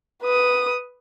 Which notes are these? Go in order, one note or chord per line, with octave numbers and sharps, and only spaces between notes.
B4 D#6